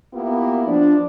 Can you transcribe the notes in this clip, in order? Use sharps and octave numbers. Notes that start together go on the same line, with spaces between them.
A#3 B3 E4 F4 G4
F3 D4